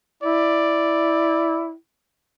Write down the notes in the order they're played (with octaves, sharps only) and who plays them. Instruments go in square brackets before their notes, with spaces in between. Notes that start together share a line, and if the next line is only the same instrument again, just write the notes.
[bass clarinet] E4 [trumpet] D5